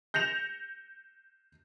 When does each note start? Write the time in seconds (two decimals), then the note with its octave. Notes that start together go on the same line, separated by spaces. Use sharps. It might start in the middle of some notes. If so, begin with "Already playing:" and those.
0.14 G6 A#6 C#7 E7 F7